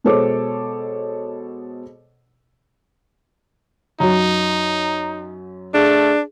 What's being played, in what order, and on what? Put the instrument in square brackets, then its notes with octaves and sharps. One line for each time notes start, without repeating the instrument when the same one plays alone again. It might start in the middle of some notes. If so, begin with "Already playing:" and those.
[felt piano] B2 G#3 A4 C5 C#5 D6
[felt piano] F#2 F#3 [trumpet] D#4 [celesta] A#5
[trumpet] A3 [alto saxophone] D4 [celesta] G#4